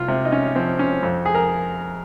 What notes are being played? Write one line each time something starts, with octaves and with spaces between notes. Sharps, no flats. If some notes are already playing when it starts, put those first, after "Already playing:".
Already playing: C2 F4
C3
D#4
C#4
F3 C4
C#4
F2
G#4
A#4